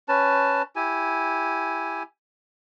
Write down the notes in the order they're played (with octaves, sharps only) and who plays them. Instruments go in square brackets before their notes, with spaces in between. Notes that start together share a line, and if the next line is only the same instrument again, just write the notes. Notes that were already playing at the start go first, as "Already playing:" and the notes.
[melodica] C#4 B4 A5
E4 G4 G#5